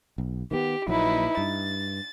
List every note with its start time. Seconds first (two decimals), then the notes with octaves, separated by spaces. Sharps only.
0.18 B1
0.51 D#3 A#3 B3 G4
0.88 A#1 A#2 F#3 D#4 E4 B4
1.37 G2 A6